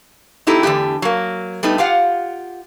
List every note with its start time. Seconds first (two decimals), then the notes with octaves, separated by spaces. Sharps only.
0.47 C4 D#4 E4 G4 A4
0.63 E2 D3 E3 A3 G4
1.02 F#3 A#3
1.63 G3 A3 B3 D#4
1.78 F4 G4 F5 F#5